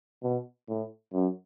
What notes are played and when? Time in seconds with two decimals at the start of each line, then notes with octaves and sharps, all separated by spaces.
0.23 B2
0.69 A2
1.13 F#2